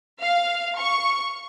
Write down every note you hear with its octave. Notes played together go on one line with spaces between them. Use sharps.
F5
C#6